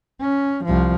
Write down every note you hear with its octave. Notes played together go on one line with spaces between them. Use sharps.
C#4
C2 F3